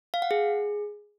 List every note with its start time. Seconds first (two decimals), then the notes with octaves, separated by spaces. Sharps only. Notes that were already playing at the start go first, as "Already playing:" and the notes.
0.14 F5
0.22 F#5
0.31 G#4